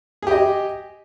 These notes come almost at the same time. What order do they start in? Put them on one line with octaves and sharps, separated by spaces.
G#4 G4 D#5